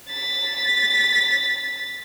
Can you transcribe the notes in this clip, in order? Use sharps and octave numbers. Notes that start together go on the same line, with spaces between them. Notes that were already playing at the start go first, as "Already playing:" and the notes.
A6 B6